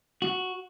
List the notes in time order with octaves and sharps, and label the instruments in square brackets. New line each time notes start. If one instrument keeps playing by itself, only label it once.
[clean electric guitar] F#4